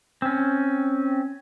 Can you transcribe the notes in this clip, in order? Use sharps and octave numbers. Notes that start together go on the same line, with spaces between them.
C4 C#4